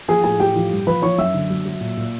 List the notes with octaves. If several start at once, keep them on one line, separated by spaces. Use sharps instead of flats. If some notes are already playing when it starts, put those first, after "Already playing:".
F3 G#4 G#5
A2 G#4 G#5
A2 G4 G5
F3
G2
F3 B4 B5
F3 C#5 C#6
F#2 E5 E6
D3
F#3
F#3
A#2
A#2